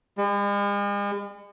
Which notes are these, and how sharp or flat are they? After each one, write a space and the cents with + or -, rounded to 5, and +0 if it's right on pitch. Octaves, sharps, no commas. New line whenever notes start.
G#3 -45